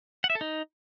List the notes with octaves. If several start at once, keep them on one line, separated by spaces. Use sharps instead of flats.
F#5
E5
A4
D#4